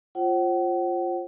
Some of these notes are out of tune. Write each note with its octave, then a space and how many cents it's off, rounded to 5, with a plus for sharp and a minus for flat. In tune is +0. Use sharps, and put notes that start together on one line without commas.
F4 +0 C5 +40 F#5 +40